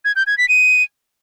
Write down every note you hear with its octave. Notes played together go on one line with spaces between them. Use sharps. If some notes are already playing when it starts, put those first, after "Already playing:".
G#6
G6
G#6
B6
D#7